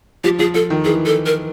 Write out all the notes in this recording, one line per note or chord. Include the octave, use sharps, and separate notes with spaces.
F3 G4
F3 G#4
F3 A4
D#3
E3 G#4
A4
A#4